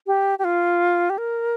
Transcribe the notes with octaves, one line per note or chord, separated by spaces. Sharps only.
G4
G4
F4
G4
A#4